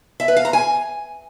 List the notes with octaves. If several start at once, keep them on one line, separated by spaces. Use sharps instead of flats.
E5
B4
F5
A#5
G#5